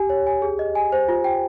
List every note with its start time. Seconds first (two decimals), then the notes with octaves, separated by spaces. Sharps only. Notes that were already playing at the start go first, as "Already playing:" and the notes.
Already playing: G4 G#5
0.10 C#5
0.27 G#5
0.42 G#4
0.59 D#5
0.75 G#5
0.92 C5
1.08 F4
1.24 G5